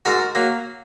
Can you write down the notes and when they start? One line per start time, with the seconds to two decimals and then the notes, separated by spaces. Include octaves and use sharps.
0.05 G#2 F#4 A#4
0.35 F#3 A#3